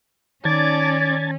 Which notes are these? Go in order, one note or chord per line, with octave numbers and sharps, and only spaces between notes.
D#3 C#4 D5 A5 G#6 A6